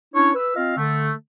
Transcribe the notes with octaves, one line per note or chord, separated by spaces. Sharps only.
C#4 D4 E4 C#5
B4 E6
C4 F4 D#5 F5
D3 A3